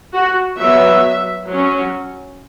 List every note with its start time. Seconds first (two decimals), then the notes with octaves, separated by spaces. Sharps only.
0.13 F#4
0.57 F#3 B3 E5
1.46 F#3 C#4